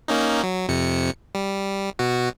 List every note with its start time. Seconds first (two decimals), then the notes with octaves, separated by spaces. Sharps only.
0.08 A#3 C#4 D#4
0.43 F#3
0.69 F2 C3 C#7
1.35 G3
1.99 B2 F#4